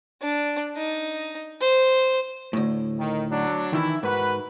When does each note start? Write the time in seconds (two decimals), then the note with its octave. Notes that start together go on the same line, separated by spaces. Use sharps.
0.22 D4
0.77 D#4
1.61 C5
2.53 D2 A2
2.98 D#3
3.31 F#3 D4
3.73 D#3 E3 E4
4.03 G#2 F#4 A#4 B4